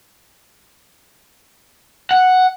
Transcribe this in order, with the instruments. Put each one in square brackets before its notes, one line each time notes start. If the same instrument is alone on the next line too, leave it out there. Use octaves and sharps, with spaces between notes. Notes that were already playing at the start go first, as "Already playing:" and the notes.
[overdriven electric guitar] F#5